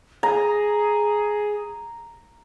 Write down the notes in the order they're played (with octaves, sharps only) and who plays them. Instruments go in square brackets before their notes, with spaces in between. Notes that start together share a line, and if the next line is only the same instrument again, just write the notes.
[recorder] G#4 [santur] A#5